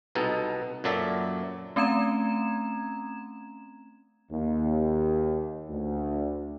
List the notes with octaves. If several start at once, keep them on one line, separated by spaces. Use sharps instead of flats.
C2 B2 B3 D#4 A4
F#2 A#2 F#3 A4 D5 E5
A3 C4 C#4 A#5 G#6 E7
D#2
D2